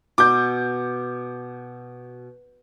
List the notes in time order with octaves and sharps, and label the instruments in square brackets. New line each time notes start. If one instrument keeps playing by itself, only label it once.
[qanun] B2 [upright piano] D6 G6